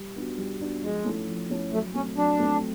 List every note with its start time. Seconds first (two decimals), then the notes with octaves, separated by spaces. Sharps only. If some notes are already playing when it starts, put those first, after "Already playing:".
Already playing: G3
0.15 B3 D4 F#4
0.38 G3
0.60 B3 D4 F#4
0.82 F3 G#3
1.05 A3 C#4 E4 A4
1.27 F3
1.50 A3 C#4 E4 A4
1.72 F#3 A3
1.94 A3 C4 C#4
2.17 F#3 D4
2.39 A3 C4